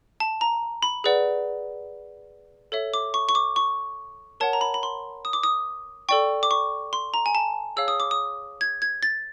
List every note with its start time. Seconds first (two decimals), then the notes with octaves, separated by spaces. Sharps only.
0.20 A5
0.41 A#5
0.83 B5
1.04 G#4 B4 D5 F#5
2.72 A4 C#5 E5
2.94 D6
3.14 C#6
3.29 C#6
3.35 D6
3.56 C#6
4.40 A#4 C#5 F#5 A5
4.53 A#5
4.61 B5
4.74 B5
4.83 C6
5.25 D#6
5.33 D6
5.43 D#6
6.09 A4 D5 G5 C#6
6.43 D6
6.51 C#6
6.93 C6
7.14 A#5
7.26 G#5
7.35 A5
7.77 G#4 C#5 F5 E6
7.88 D#6
8.00 D6
8.11 D#6
8.61 G#6
8.82 G#6
9.03 A6